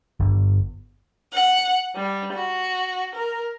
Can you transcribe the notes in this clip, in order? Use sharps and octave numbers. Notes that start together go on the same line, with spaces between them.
G1
F#5
G3
F#4
A#4